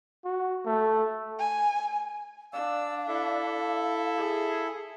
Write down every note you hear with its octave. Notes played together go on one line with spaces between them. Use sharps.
F#4
A3
G#5
D4 F5 E6
E4 A4 E5
G#4